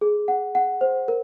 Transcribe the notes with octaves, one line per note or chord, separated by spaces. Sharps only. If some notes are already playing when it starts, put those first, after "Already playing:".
G#4
F#5
F#5
C5
A#4